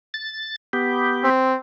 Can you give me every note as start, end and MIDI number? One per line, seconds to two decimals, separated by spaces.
0.14 0.56 93
0.73 1.30 59
0.73 1.30 67
1.24 1.56 60